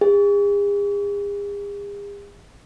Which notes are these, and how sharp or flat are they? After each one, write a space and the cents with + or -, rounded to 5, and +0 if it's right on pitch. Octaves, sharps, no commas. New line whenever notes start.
G#4 -45